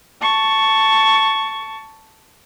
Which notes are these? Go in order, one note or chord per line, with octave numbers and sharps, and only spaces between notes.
A5 C#6